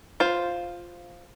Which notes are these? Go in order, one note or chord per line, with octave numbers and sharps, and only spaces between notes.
F4 C5